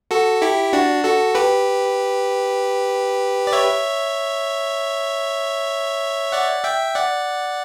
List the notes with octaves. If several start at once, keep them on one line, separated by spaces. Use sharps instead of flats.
F#4 A4
E4 G4
D4 F#4
F#4 A4
G4 B4
D5
C#5 E5
D5 F#5
E5 G5
D5 F#5